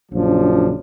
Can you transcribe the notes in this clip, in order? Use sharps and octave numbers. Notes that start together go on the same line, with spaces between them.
A#1 F#2 C#3 F3 D4